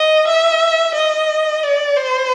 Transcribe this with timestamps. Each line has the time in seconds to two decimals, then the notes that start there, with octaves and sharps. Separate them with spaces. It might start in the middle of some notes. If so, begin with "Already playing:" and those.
Already playing: D#5
0.27 E5
0.95 D#5
1.63 D5
1.96 C5